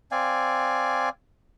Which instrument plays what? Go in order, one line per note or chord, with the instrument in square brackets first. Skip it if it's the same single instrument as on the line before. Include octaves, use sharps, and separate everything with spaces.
[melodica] C4 D5 F5 G#5